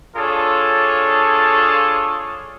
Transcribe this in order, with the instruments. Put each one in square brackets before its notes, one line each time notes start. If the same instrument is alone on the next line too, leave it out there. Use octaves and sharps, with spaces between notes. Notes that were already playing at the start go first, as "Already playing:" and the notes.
[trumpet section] D4 F4 G#4 A4 C#5